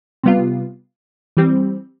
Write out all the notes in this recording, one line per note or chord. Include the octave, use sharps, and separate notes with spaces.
C3 G3 B3 F4
E3 G3 C4